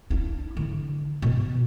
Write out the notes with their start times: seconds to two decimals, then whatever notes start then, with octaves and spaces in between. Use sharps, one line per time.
0.10 D4 E4
0.57 D3
1.22 B2